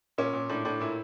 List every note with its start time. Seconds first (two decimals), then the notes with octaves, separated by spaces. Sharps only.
0.18 A#2 C#4
0.33 A#2
0.49 A2 D4
0.65 A2 D4
0.80 A#2 E4